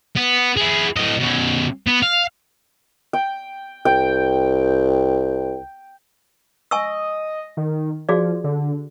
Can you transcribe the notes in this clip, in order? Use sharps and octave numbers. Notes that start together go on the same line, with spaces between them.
B3
E4 G#4
A2 D#5
B2 C#4
B3
F5
G5
C2 G5
D#5 G#5 C#6 E6
D#3
F3 F#4 G#4 D5
D3